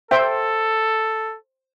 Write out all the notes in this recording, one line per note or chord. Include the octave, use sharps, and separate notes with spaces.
A4 C5 E5 G5